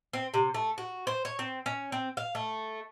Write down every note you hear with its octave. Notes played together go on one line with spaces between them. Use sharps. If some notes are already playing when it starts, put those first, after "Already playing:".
C4
C3
A3
F#4
C5
C#5
C4
C#4
C4
F5
A3